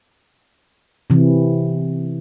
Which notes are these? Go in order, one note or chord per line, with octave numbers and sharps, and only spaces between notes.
C3 E3